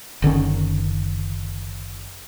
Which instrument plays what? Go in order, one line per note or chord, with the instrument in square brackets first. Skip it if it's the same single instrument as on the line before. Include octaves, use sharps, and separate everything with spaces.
[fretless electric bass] F#1 D3 D#3 C#4